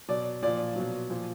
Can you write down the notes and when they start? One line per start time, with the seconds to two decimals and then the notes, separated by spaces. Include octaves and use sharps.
0.08 B2 F#3 D5
0.42 A#2 F3 D5
0.76 B2 F#3
1.10 A#2 F3